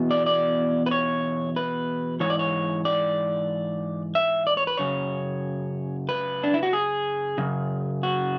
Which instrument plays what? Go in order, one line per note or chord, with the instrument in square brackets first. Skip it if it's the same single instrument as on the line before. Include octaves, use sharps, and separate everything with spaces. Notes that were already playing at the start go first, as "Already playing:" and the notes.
Already playing: [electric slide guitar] E2 B2
D5
D5
B4
C#5
B4
G#2 E3 C#5
D5
C#5
D5
E5
D5
C#5
B4
F#2 C#3 C#5
B4
D4
E4
F#4
G#4
F#2 C#3
F#4